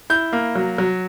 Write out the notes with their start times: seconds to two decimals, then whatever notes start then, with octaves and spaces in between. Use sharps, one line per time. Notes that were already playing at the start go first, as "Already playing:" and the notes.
0.10 E4 G6
0.33 A#3
0.55 F#3
0.78 F#3